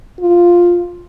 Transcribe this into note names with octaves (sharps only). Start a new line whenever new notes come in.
F4